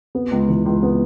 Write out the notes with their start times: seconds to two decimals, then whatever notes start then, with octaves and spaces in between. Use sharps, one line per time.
0.15 B3
0.31 C#2
0.49 E3
0.66 C#2
0.83 B3